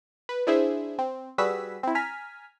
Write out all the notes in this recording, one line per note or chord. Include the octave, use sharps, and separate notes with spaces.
B4
D4 E4 G#4 C5 E5
C4
G3 F#4 G#4 B4 E6 B6
C4 E4
G#5 A#5 F6 B6